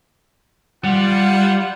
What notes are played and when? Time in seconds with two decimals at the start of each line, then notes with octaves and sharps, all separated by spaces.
0.84 G3 F4 F#5